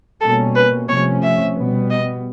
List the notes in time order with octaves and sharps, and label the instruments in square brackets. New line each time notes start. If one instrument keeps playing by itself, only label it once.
[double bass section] B2 G3 A#3 C#4 [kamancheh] A4
[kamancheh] B4
[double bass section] C3 F3 A3 C#4 [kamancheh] C#5
[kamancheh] E5
[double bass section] B2 G3 B3
[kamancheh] D#5